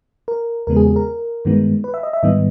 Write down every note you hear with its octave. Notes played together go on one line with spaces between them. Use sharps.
A#4
E2 C#3 G#3 B3 A#4
G#4
G#4
A#4
G2 D#3 G#3 B3
B4
E5
D#5
E5
G#2 D#3 G3 B3 D#5